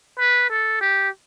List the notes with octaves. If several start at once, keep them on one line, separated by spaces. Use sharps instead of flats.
B4
A4
G4